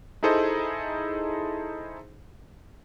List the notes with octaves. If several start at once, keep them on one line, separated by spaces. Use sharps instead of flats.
D#4 E4 G#4 A4 C5 D#5